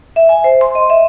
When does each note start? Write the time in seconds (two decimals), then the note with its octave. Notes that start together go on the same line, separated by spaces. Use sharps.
0.16 E5
0.29 G#5
0.44 C5
0.61 C6
0.75 D#5
0.90 E5